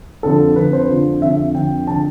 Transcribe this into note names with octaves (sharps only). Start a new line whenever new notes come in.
F2 D3 F3 A4
F2 D3 F3 B4
C5
F2 D3 F3
F2 D3 F3 E5
F2 D3 F3 G5
D3 F3 A5